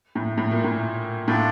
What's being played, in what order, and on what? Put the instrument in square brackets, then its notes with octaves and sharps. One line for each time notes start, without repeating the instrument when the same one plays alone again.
[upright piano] A2
A2
A#2
A2
[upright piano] A2 [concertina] D4 F4 A4 D5